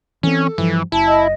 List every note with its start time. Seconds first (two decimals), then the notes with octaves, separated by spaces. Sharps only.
0.23 E3 C4 C#4 A4
0.58 G2 E3 F3
0.92 F#1 E4 A5
1.07 D#5